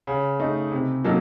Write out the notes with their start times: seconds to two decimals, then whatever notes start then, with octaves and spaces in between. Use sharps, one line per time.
0.07 C#3
0.40 A3 D#4
0.72 C3
1.04 F#3 A#3 D#4 A4